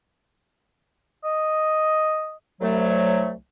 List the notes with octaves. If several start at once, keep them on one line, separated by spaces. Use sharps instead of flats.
D#5
C2 F#3 A3